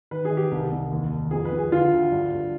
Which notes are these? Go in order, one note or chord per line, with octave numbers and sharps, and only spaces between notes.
D#3 B4
G#4
D#3
G4
C2
C2
D#2
D#3
F2 G#4
B4
F2
G#4
D3 F4
D2
G2
G2